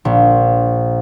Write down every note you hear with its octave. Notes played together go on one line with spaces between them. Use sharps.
A#1